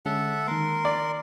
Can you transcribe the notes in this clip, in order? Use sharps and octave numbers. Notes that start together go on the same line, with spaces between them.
D3 G#3 C#4 A4 E5 F#5
D#3 A#3 A#4 C6
D5